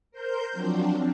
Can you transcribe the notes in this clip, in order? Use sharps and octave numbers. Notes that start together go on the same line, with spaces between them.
A#4 C5 G6
F3 F#3 C4 D4